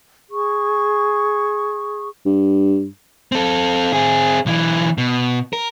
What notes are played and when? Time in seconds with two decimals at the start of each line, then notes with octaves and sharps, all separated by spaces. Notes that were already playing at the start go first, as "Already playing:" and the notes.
0.31 G#4 C#6
2.26 G2
3.32 C4 A4
3.93 C4 G#4
4.46 B1 E3
4.98 B2
5.53 A#4